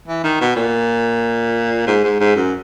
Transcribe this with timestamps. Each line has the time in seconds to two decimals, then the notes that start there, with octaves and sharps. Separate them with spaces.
0.08 E3
0.24 D#3
0.41 B2
0.56 A#2
1.87 G#2
2.04 G#2
2.20 G#2
2.36 F#2